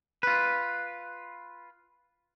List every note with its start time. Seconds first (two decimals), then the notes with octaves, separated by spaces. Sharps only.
0.23 F4 B4